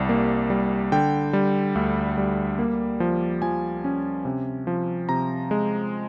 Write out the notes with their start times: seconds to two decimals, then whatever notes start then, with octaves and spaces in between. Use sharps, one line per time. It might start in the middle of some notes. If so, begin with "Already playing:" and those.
Already playing: C2 G3
0.09 A#3
0.50 G3
0.92 D3 G5
1.33 G3
1.75 D2
2.18 G3
2.59 A#3
3.00 F3
3.42 F3 G#5
3.84 C#4
4.25 C3
4.67 F3
5.09 C3 A#5
5.51 G#3